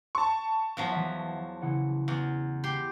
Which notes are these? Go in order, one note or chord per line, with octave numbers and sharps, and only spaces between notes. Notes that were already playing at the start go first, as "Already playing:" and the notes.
A5 C#6
E2 F3 F#3
E3 E5
C#3 E3 F#5
E2
G4 C6